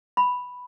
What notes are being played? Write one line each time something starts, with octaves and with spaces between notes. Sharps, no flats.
B5